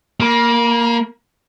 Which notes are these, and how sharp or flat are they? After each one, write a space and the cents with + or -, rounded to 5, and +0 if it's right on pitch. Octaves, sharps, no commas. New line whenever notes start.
A#3 +0 B5 -40